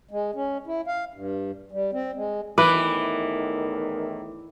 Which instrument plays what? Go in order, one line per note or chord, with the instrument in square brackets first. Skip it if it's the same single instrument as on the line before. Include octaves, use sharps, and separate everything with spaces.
[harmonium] G#3
C#4
E4
F5
G2
G3
C4
G#3
[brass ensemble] E2 A2 D#3 [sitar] E3 [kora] B4 [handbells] D6